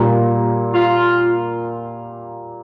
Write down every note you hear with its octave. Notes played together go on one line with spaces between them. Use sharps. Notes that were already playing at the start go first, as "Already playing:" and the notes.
Already playing: A#2 G3 A#3
F4